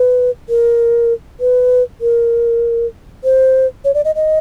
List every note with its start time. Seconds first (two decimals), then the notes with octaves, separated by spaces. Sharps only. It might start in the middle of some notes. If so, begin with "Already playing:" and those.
Already playing: B4
0.49 A#4
1.40 B4
2.01 A#4
3.24 C5
3.85 C#5
3.94 D5
4.05 D#5
4.15 D#5